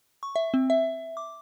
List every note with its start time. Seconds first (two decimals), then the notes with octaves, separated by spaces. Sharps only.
0.23 C#6
0.36 E5
0.54 C4
0.70 E5
1.17 D6